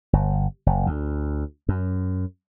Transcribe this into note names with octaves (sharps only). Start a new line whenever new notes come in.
G1
F#1
D2
F#2